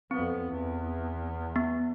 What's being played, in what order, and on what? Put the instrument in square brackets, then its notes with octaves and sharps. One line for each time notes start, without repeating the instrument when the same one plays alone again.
[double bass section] F2 B3 [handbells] C4
[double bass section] E2
[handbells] B3